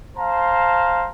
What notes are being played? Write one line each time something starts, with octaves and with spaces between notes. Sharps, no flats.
C5 F5 A5 A#5